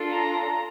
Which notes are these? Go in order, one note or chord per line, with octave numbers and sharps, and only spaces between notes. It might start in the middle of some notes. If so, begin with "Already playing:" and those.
Already playing: D4 F4 A4
A#5